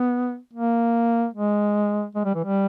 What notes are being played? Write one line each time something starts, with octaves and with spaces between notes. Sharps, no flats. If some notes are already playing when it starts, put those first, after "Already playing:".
Already playing: B3
A#3
G#3
G#3
G3
E3
G3